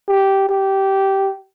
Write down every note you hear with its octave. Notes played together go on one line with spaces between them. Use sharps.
G4
G4